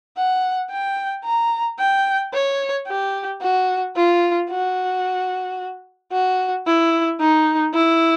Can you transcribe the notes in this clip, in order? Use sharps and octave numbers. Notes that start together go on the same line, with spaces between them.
F#5
G5
A#5
G5
C#5
G4
F#4
F4
F#4
F#4
E4
D#4
E4